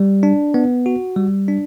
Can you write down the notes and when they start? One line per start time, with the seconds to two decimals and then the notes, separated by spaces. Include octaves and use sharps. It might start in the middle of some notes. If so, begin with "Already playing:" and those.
Already playing: G3
0.23 D4
0.54 B3
0.86 F#4
1.16 G3
1.48 D4